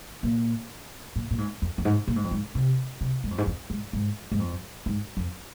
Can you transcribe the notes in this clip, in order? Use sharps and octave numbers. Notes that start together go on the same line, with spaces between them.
A#2
A#2
A#2
G#2
F2
F2
G#2
A#2
G#2
F2
G#2
C3
C3
G#2
F2
G#2
F2
G#2
G#2
G#2
F2
G#2
F2